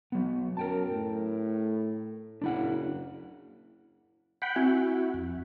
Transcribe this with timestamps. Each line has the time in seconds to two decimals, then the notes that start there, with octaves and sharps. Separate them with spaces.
0.12 F#3 B3
0.57 F#2 A#4 G5 A5
0.91 A2
2.42 F#1 D4 E4 F#5
4.42 F#5 G5 B5
4.56 C4 E4 F#4
5.14 F2